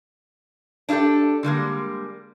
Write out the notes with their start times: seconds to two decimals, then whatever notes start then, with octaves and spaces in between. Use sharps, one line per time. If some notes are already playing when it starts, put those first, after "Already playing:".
0.89 D4 E4 F4 G4 A4
1.43 D3 G3 G#3 A#3